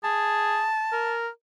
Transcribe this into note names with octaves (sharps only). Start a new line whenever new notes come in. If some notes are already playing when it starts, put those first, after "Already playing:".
G#4 A5
A#4